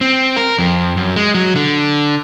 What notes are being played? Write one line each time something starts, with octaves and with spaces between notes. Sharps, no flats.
C4
A#4
F2
F#2
G#3
F#3
D3